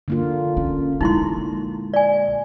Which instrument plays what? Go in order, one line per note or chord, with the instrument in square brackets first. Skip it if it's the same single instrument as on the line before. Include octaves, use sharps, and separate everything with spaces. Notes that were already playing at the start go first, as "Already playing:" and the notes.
[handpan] D3 A#3 F4
[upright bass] C#4
[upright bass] A#1 G#3 [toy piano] D#4 E4 C6
[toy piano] D5 G#5